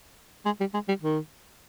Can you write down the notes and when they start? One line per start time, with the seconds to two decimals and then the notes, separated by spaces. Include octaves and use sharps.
0.45 G#3
0.60 G3
0.74 G#3
0.88 G3
1.02 D#3